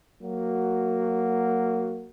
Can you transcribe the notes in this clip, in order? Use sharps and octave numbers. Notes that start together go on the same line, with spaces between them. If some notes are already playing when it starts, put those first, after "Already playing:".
F#3 A#3 F#4